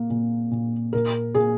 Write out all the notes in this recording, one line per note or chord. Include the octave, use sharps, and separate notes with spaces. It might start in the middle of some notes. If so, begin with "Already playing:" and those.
Already playing: A#2 A#3
A#2
A#2
A#2 A#4
A#2 G#4